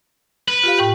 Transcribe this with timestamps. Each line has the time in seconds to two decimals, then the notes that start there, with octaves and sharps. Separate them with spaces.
0.48 B4
0.64 F4 G4 F5
0.78 A2 G5 G6